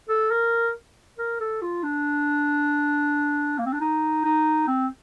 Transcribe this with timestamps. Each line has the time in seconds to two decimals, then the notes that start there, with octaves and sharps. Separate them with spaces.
0.09 A4
0.31 A#4
1.18 A#4
1.40 A4
1.62 F4
1.84 D4
3.58 A#3
3.66 C4
3.73 D4
3.81 D#4
4.25 D#4
4.68 C4